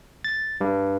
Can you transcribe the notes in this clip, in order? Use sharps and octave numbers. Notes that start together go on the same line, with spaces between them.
A6
G2